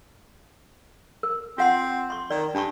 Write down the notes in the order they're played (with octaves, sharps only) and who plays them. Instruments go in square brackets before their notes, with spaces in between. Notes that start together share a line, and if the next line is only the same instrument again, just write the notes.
[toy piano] A#4
[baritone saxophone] C4 [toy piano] F4 F#5 C6
[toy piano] C6 C#6
[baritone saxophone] D#3 [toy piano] D5
[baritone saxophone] G2 [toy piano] D4 C#6